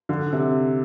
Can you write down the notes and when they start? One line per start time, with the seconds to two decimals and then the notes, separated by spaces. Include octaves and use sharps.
0.09 D3
0.33 C3